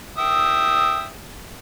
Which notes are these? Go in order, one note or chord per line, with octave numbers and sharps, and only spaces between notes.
E5 G5 D#6